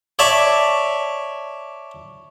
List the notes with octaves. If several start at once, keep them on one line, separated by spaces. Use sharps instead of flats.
C#5 D5 E5 A5